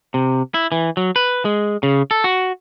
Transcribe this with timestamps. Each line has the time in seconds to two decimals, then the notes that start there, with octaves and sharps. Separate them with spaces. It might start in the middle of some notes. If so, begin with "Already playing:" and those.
0.14 C3
0.54 E4
0.72 E3
0.97 F#3
1.16 B4
1.45 G#3
1.83 C#3
2.11 A4
2.24 F#4